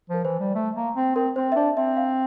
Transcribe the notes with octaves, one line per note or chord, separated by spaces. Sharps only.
F3 A#4
E3 C5
G3
A3
A#3
C4
C4 A#4
C4 C5
E5
D4 D5
C4 E5
F5